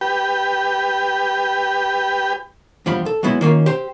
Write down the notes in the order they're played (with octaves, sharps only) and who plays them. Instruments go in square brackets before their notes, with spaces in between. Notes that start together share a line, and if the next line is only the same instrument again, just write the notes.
[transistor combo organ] G4 B4 G5
[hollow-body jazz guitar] E2 G2 F3 G4 B5
A4
F#3 G#3 B3 E4
D#3 A#3 C#4 F4
G4 C5